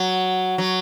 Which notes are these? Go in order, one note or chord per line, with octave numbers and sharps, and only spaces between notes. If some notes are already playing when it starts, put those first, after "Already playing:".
Already playing: F#3
F#3